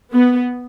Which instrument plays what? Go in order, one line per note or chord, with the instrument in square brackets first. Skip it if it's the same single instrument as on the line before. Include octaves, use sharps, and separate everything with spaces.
[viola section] B3